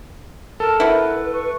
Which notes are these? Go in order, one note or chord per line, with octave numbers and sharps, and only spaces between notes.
A4 A#4 A5
E4 F#4 B4
C#6